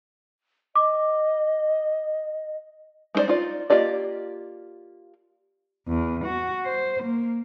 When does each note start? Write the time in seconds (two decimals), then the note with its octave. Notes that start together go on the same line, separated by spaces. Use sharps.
0.76 D#5 D6
3.15 G#3 D#4 E4 C5 D5
3.28 D#4 F4 D5
3.70 A#3 F4 G4 D5 D#5
5.88 E2
6.25 F#4
6.66 C5
7.03 A#3